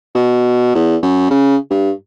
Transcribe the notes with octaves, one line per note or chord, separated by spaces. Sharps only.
B2
E2
F#2
C#3
G2